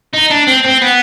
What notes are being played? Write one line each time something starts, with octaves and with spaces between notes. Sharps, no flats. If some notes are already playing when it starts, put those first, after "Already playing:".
D#4
D4
C4
C4
B3